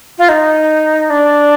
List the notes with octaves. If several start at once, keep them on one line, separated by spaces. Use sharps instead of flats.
F4
D#4
D4